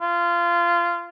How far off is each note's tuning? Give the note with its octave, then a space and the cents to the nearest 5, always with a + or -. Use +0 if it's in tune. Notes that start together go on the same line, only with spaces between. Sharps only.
F4 -20